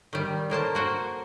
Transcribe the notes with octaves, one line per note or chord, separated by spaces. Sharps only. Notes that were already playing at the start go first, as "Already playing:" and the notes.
D#3 G3
A2 A#3 C5 A5
A#3 F#4 C5